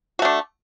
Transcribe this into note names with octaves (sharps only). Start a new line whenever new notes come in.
A3 D4 F#4